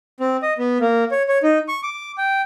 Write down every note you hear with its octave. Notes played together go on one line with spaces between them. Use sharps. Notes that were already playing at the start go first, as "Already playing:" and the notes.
C4
D#5
B3
A#3
C#5
C#5
D#4
C#6
D6
G5